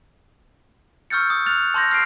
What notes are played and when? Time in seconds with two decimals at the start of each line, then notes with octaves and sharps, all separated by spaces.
1.10 C#6 E6 F6 G6 A6 C#7
1.30 D#6
1.46 F6 F#6 A6 F7
1.74 A5 C6 G6 A#6
1.91 F6 C7 D7